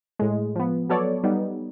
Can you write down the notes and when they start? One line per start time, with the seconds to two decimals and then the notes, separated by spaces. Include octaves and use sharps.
0.19 A2 G#3
0.56 F3 B3
0.89 F#3 B3 A4 C#5 D5
1.24 G3 B3 D#4